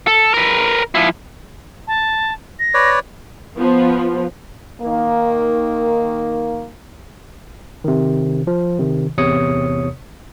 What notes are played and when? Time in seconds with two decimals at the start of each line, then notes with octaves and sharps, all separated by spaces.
0.07 A4
0.34 A#4 B4
0.95 F3 E4
1.87 A5
2.59 A#6
2.74 B4 C#5 D5
3.57 F3 B3
4.81 D#3 A#3
7.84 C3 D#3
8.47 F3
8.79 C3 D#3
9.18 A1 E2 C3 C#5 D#6 C#7